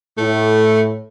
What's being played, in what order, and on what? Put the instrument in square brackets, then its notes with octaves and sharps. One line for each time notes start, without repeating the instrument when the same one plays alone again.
[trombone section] A2 [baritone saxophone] A3